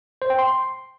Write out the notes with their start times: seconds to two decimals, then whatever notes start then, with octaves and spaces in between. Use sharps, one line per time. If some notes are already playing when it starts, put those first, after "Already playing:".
0.22 C5
0.30 G5
0.39 C6